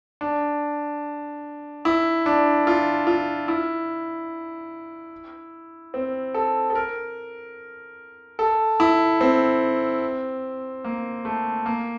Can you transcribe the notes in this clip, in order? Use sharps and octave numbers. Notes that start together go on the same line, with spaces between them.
D4
E4
D4
F4
F4
E4
C4
A4
A4
A#4
A4
E4
C4
A#3
A3
A#3